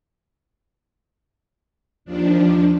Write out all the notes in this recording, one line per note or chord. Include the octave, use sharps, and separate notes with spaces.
D#2 F3 D4